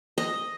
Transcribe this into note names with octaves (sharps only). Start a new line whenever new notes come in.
D#5